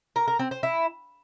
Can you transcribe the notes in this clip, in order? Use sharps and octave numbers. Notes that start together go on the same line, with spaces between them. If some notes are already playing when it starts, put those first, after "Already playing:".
A#4
A#4
C4
C5
E4